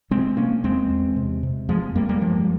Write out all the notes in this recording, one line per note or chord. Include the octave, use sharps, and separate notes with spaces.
C3 G#3 C4
C3 A#3 C#4
E2 G#3 C4
E2
C3
C3
F2 F3 G#3
F2 G3 A#3
G3 A#3
G2 F3 G#3